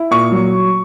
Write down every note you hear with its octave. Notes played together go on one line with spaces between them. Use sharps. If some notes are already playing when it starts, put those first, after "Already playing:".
Already playing: E4
A#2 C#6
F#3